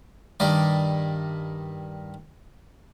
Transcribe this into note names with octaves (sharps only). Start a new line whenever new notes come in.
G2 D#3 D5